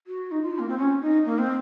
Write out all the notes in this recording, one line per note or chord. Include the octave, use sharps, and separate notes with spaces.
F#4
D#4
F4
A#3
C4
C#4
D#4
A#3
C4